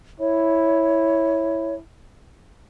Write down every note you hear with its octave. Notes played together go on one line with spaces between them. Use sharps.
E4 C#5